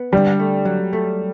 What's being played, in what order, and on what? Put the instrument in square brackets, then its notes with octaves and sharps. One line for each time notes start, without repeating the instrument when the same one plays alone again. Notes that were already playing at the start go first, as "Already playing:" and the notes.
Already playing: [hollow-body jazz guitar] B3
[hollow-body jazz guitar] D3 [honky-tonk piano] G3
[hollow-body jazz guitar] A3
F#3
A3